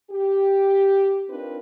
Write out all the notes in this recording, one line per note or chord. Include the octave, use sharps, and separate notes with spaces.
G4
C4 D4 D#4 F4 A#4 B4